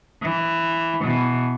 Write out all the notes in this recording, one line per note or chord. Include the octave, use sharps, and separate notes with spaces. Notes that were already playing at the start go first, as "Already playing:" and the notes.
E3
B2 E3